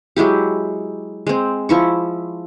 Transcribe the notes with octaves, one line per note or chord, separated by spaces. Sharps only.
F#3 G#3 E4 G4
G#3 C4
F3 E4 C#6